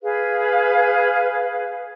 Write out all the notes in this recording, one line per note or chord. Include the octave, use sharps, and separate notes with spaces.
G#4 B4 F5